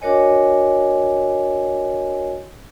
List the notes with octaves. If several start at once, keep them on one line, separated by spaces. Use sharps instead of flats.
D4 F#4 A#4 C#5 D#5 G#5